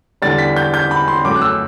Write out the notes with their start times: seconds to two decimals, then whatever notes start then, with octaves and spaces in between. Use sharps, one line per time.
0.22 E2 D3 G3 A6
0.39 B6
0.56 G6
0.74 G6
0.91 B5
1.08 C6
1.24 G1 F#2 F#3 A3 D6
1.36 F#6
1.42 E6